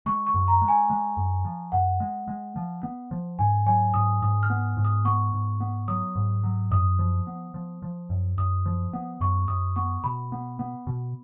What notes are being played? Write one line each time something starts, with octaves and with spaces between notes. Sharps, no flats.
G#3 C#6
C#6
F#2
A#5
G#3
G#5
G#3
F#2
F3
F#2 F#5
G#3
G#3
F3
B3
F3
G#2 G#5
F#3 G#5
G#2 D#6
G#2 D#6
F6
B3
G#2
D#6
B3 C#6
G#2
B3
F#3 D#6
G#2
F#3
F#2 D#6
F3
B3
F3
F3
F#2
F#2 D#6
F3
B3
F#2 C#6
F#2 D#6
B3 C#6
B2 B5
B3
B3
B2